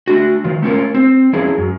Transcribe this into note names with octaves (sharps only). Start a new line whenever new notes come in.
A3 D4 F#4
D#3 F3
A3 C#4 F4 A#4
C4
F3 C#4 E4 G#4
F#2